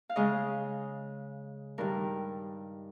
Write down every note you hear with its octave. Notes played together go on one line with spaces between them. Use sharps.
F5
C#3 G#3 C#4 D#5
G2 D#3 G3 A#4